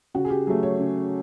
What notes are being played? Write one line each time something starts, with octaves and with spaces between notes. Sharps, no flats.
C#3 F#4
G#4
G4
F#3 A3 G#4
C#5
C#3